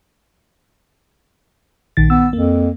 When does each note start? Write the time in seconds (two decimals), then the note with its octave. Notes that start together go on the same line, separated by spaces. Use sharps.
1.97 A#1 D#3 A6
2.10 B3 E6
2.33 F2 A#3